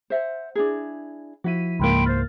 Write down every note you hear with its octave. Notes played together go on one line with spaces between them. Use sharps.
C5 E5 F#5
D4 E4 G#4
F3 E4 F#4 B6 D#7
C#2 G#2 A#3 G5 B5 C6
C5 F6 A6